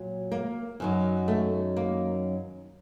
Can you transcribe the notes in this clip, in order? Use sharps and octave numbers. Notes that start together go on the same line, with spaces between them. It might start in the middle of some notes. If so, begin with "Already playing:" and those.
Already playing: A#2 F#3
A#3
F#2 D#3 F#3
A3
A#3